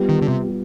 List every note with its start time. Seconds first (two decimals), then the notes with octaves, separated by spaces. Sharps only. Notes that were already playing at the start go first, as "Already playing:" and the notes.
Already playing: G3 B3 F4
0.09 D#3
0.22 D3
0.28 C3
0.49 G3